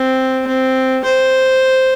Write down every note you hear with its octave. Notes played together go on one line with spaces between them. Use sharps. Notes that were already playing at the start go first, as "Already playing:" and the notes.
Already playing: C4
C4
C5